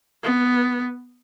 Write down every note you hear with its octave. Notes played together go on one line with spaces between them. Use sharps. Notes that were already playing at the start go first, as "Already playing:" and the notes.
B3